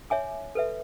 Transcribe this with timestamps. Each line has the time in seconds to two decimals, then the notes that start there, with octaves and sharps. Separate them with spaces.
0.10 C#5 E5 G#5 D6
0.55 A4 B4 E5